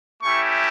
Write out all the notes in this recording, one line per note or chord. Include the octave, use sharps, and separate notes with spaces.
A3 C#4 E4 G4 C#6